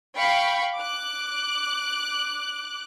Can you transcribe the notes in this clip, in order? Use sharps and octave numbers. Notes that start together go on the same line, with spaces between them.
F5 G5 B5 C#6
D6 F#6